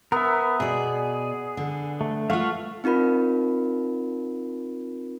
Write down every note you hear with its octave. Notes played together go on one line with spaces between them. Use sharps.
B3 A#4 E5
B2 G#4 D5
D3
A3
A3 F4 F5 F#5 C#6
C4 D#4 F4 A#4 B5